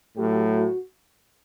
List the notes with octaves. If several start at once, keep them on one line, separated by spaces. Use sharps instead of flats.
A2 F#3 A3 G4
F#4